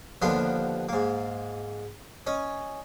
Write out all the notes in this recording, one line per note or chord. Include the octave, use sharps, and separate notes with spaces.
D#2 D3 F3 B3 F5 C6
G#2 A#3
C#4 D#5